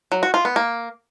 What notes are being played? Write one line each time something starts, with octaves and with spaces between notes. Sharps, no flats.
F#3
F#4
F4
B3
A#3